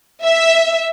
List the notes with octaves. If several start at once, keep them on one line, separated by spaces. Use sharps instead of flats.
E5